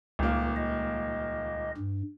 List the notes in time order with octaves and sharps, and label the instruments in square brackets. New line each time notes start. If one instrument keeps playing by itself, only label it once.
[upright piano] D#1 A#3 [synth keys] C#2
[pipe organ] D#5
G2